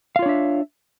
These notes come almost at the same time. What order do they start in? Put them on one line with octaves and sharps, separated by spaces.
F5 F4 C#5 D4 E5